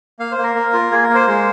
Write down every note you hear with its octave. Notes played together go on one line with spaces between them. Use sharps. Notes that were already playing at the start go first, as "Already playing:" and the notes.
A#3 F5
C5
A#3
A#4
A#3
F4
A#3 G#4
A#4
A#3
C5
G#3